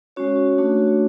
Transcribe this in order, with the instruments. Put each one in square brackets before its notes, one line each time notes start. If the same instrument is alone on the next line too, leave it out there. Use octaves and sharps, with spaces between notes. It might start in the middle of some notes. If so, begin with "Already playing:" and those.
[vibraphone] G#3 C#4 F#4 C#5
A3 D4 F#4